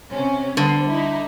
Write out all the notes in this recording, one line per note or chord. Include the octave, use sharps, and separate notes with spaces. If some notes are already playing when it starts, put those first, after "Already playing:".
C3 C#4
D3 G3 B3 C5
D#4 E4